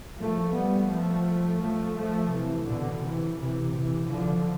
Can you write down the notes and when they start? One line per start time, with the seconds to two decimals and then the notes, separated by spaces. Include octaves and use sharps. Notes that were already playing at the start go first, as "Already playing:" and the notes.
0.16 F3 A3
0.51 G3 B3
0.87 F3 A3
1.59 F3 A3
1.94 F3 A3
2.29 C3 E3
2.65 B2 D3
3.00 C3 E3
3.36 C3 E3
3.72 C3 E3
4.08 D3 F3